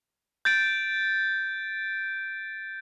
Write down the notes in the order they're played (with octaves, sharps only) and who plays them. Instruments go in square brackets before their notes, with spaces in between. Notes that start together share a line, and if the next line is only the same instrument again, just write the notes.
[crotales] G6 A6 D7